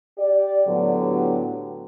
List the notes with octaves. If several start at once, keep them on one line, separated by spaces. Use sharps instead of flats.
G4 D5
A2 D3 F#3 B3 G4